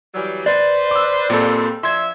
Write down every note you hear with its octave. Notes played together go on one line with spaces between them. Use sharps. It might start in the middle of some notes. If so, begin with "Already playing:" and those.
E3 F#3 G3
B4 C5 D5
D6 E6
A#2 G3 G#3 C4 A4
F3 D4 E5 C6 G#6